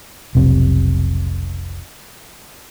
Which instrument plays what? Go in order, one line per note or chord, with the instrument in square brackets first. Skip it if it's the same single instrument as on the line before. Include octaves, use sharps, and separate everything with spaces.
[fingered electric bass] F1 B1 C3